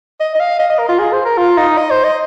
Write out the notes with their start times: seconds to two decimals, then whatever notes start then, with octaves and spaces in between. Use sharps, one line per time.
0.20 D#5
0.35 D#5
0.40 F5
0.59 D#5
0.70 D#5
0.79 A#4
0.89 F4
0.99 G#4
1.13 C5
1.25 A#4
1.38 F4
1.58 D#4
1.78 D#5
1.91 C5
2.04 D#5